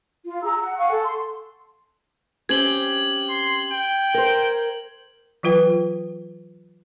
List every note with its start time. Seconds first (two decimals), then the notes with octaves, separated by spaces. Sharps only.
0.25 F4
0.44 G#4 A#5 E6
0.61 F#5
0.78 F5 F#5 G#5 C#6
0.92 A4
1.04 C6
2.49 C4 C#4 G4 G#6 F#7 G7
3.30 C6
3.72 G5
4.14 A#4 C5
5.43 E3 F#3 F4 B4 G5